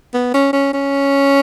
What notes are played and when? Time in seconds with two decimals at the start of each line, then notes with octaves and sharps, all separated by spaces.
0.14 B3
0.34 C#4
0.53 C#4
0.73 C#4